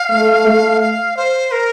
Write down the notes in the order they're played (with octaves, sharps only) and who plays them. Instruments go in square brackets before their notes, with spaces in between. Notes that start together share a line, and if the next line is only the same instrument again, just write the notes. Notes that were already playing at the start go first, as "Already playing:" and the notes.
Already playing: [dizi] F5
[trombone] A3
A3
[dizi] F5
C5
A#4